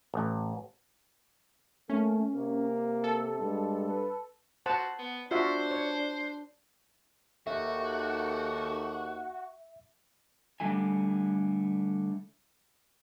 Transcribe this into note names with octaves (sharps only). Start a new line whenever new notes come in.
A1
A3 A#3 C#4
C3 A#3
A4
G2 G#3
B4
F#4 C5 F#5 A5
B3
D4 F4 F#4 C5 E5
C#5
D#2 D#3 F#4 G4 A4 E5
D3 G3 A3 E4 G#5